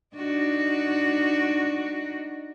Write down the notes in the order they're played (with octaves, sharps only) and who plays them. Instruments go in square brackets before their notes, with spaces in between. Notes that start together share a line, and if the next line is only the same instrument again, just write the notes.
[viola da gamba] D4 D#4 F#4